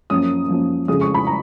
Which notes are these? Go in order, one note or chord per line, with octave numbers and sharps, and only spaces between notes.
F#2 F3 A#3 C#4 D#6
F#2 F3 A#3 C#4
F2 C#3 G#3 C#4 D#6
C#6
B5
A#5